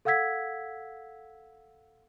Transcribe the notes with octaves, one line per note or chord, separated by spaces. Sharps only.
A4 F5 F#5 E6 G#6 B6